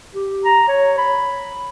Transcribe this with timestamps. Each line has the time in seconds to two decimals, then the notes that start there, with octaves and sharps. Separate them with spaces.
0.15 G4
0.45 A#5
0.68 C#5
0.98 B5